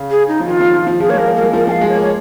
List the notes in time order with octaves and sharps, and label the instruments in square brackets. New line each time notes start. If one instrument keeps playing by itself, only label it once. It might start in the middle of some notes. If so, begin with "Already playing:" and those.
Already playing: [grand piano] C#3
[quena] G#4
D#4
[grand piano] F3
[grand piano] D#3 [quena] F4
[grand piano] F3
F3
F3
[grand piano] F3 [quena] G#4
[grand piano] A#3 [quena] C#5
[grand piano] G#3 [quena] A#4
[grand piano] A#3
[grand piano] G#3 [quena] A#4
[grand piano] F3 [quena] A#4
[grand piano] F3 [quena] G#5
[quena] F5
[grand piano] G#3
[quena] C#5
[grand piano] A#3
[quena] C#5